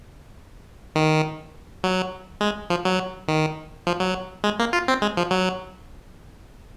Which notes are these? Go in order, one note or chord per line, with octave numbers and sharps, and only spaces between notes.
D#3
F#3
G#3
F3
F#3
D#3
F3
F#3
G#3
A#3
F4
C4
G#3
F3
F#3